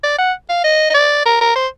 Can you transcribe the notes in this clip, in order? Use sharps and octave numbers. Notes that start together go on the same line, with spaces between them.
D5
F#5
F5
D#5
D#5
D5
A#4
A#4
C5